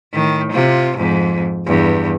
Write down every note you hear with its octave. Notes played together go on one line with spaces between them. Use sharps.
A2 D#3
C3 F4
F2 G#2
E2 G2